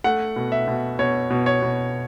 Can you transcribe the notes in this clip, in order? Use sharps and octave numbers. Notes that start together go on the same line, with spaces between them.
A3 F#5
B2
E5
B2
B2 C#5
B2
C#5
B2